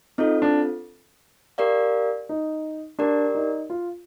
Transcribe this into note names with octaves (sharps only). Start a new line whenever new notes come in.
C4 D#4 F4 A4
D4
G4 A#4 D5 F5
D#4
D4 G4 A#4 D5
D#4
F4